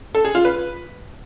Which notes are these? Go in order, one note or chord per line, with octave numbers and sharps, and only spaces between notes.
A4
G#4
F4
B4